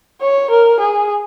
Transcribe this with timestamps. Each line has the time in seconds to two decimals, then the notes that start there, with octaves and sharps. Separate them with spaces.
0.22 C#5
0.50 A#4
0.80 G#4